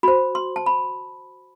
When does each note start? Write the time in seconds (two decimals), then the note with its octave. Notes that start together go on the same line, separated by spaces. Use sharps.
0.03 F#4 C5 B5
0.35 C6
0.56 A5
0.66 B5